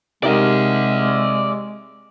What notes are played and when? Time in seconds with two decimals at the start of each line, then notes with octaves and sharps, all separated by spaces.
0.23 C3 G#3 D#4 G4 A#4 D5 E5